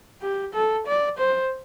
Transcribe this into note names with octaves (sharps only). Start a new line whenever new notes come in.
G4
A4
D5
C5